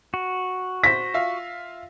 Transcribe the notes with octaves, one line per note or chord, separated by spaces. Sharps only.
F#4
C5 A#6 B6
F4 E5 F5